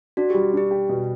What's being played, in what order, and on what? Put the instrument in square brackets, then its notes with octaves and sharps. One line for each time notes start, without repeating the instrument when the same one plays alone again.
[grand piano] D4 [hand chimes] F#4
[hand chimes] G4
[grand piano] G3
[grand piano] D4 [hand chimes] G4
[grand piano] G4
B2